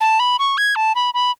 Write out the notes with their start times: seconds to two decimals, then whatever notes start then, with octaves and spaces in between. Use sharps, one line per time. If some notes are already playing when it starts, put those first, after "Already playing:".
0.01 A5
0.20 B5
0.39 C#6
0.58 G#6
0.76 A5
0.95 B5
1.14 B5